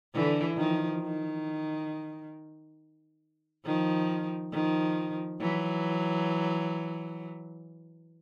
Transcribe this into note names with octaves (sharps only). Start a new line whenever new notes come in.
D3 E3
D#3 F3
D#3
D#3 F3
D#3 F3
E3 F#3